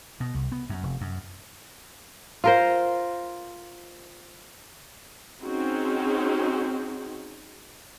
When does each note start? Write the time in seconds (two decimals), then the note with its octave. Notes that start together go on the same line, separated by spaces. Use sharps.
0.20 B2
0.34 C2
0.52 B3
0.69 F#2
0.83 F1
1.01 F#2
2.44 F4 A#4 C5
5.43 C4 C#4 D#4 F#4 G#4